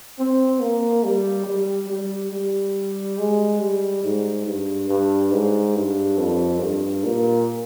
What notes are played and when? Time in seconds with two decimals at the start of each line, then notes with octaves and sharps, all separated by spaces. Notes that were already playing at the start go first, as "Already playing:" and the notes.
0.19 C4
0.61 A#3
1.04 G3
1.46 G3
1.90 G3
2.33 G3
3.18 G#3
3.60 G3
4.04 G#2
4.47 G2
4.89 G2
5.32 G#2
5.76 G2
6.18 F2
6.61 G2
7.04 A#2